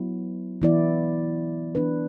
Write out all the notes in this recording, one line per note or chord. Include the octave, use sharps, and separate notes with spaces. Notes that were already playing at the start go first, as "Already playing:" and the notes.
Already playing: F#3 B3 E4
E3 B3 E4 D5
E3 B3 D4 B4